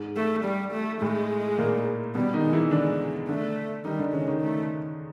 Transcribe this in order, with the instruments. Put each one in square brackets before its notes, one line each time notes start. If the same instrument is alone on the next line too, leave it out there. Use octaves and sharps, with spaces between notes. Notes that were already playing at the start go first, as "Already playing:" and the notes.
Already playing: [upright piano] G#2 G#3
[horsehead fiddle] A3
G3
A3
[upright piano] A2 A3 [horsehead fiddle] G#3
[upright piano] A#2 A#3
[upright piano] B2 B3 [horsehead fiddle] G3
[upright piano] D#3 D#4
[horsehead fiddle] G#3
[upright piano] E3 E4
[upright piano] D3 D4 [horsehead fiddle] G#3
[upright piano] D3 D4 [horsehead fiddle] A3
[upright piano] D#3 D#4 [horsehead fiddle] G3
[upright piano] D3 D4
[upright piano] C#3 C#4 [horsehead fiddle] G#3
[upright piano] D#3 D#4
[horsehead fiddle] A3